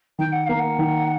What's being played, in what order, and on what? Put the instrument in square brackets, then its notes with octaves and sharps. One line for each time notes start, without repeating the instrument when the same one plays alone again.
[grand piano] D#3 [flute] G5
[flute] F#5
[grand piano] A#3 [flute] F5
[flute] F#5
[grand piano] D#3